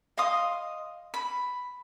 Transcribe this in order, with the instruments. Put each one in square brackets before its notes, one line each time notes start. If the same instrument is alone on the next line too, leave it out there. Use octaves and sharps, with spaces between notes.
[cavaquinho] D#5 F5 C6 D#6
B5